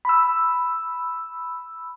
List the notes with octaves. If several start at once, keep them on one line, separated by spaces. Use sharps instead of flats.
B5 E6